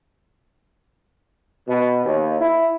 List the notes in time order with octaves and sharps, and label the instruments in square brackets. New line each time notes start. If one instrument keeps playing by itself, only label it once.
[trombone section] B2
D#2
E4